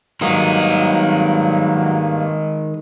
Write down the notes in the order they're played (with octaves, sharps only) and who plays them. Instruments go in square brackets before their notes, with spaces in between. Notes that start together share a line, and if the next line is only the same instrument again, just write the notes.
[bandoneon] G2 A#3 [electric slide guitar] D#3 G#3 D#4 [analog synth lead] F#3